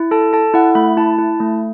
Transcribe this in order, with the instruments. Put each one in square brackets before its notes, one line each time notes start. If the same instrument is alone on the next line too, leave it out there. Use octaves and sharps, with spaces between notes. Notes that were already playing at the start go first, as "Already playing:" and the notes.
Already playing: [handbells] E4
A4 A5
A4 A5
E4 F#5
A3 B5
E4 A5
E4
A3